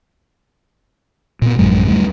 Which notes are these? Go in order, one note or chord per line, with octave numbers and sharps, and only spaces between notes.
A#2 B3
A1 F#2 F#3 G#3
D2 G3 A3